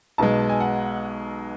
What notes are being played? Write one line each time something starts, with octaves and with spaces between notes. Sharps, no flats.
B1 B2 G#3 A5
G#5
F#5